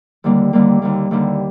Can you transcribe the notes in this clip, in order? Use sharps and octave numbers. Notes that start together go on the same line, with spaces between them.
D#2 D3 G3 A#3
D#2 D3 G3 A#3
D#2 D3 G3 A#3
D#2 D3 G3 A#3